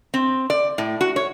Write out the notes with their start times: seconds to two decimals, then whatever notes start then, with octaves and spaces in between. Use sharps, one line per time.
0.14 C4
0.50 D5
0.78 A2
1.01 F#4
1.16 C#5